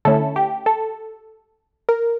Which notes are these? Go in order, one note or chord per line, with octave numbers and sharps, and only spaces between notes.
D3 A3 C#4 E4 A4
G4
A4
A#4